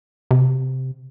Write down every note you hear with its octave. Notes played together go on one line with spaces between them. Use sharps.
C3